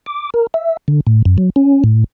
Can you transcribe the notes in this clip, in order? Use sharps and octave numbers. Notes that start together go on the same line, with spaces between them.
D6
A#4
E5
D3
A2
F#2
F#3
C#4
A2